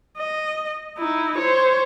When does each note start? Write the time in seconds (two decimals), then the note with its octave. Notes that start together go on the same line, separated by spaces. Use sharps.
0.17 D#5
0.98 D#4 E4
1.39 C5 C#5